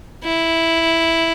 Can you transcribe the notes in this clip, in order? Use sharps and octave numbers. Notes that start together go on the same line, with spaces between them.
E4